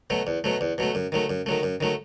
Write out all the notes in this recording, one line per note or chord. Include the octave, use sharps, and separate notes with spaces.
B2 F#3 A3
E2
B2 F#3 A3
E2
B2 F#3 A3
F#2
D#3 F#3 A3
F#2
D#3 F#3 A3
F#2
D#3 F#3 A3